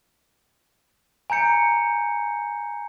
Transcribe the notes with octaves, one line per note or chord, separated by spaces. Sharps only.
G#5 A#5 G6 C#7